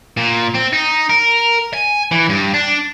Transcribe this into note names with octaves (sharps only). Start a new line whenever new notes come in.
A#2
C4
D#4
A#4
G#5
E3
G2
D4